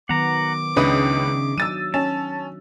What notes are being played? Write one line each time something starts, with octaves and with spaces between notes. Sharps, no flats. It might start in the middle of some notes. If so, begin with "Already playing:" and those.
D#3 F#3 B3 F#5 A#5 D6
C#2 C#3 D4 D#4 B4 E5 D#6
F#3 E6 A6 D#7
C#4 A5